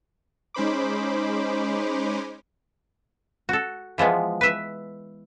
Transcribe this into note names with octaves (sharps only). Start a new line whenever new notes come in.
G#3 C#4 D#4 C5 B5 D6
F#4 A4
E3 F3 G#3 B3
B4 E5